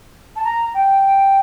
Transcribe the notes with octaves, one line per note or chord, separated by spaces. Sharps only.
A5
A#5
G5